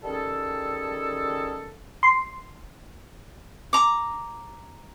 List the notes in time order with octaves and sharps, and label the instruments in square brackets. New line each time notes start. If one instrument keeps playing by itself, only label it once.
[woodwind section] D#3 G3 C#4 G#4 A4
[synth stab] C6
[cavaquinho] A#5 D6